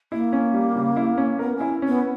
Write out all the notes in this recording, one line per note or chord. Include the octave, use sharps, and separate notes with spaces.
A#3 E4
C#4
G3
C#3
E4
C#4
B3 A#4
C#4 E4
B3 C#4